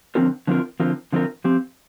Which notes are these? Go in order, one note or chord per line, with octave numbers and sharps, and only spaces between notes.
D3 F3 C4 F4 A#4
D3 F3 C4 F4 A#4
D3 F3 C4 F4 A#4
D3 F3 C4 F4 A#4
F3 C4 G4